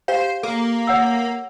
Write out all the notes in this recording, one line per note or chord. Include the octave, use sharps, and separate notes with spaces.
G4 C5 F5 G5
A#3 A4
C#5 F#5 E6